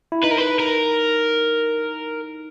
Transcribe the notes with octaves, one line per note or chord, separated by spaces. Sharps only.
E4
D#4 B4
A#4
B4
A#4